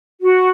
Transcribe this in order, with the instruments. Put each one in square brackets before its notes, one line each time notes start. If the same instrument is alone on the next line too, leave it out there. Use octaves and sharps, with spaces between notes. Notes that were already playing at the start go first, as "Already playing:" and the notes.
[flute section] F#4